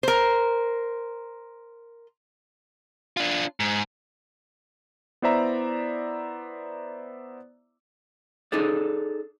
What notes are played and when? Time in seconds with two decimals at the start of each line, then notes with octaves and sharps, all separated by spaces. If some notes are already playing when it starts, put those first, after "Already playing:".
0.03 A#4 C5
3.17 D4 F4
3.60 G#2
5.22 B3 E4 C5 D5 E5 A#5
8.52 D#4 G#4 A4 D5